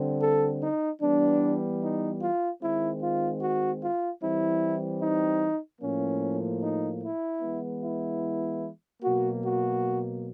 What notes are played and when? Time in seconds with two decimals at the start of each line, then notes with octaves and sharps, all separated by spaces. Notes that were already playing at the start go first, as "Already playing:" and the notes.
Already playing: D3 G3 C4
0.20 A4
0.61 D#4
1.00 E3 G3 B3 D4
1.81 D#4
2.20 F4
2.60 D#3 G#3 C4 E4
3.00 F4
3.41 F#4
3.81 F4
4.20 E3 G3 C4 E4
5.00 D#4
5.81 A2 F3 A#3 C#4
6.61 D#4
7.02 E4
7.41 E3 G#3 B3
7.82 E4
9.01 B2 F#3 A#3 F#4
9.42 F#4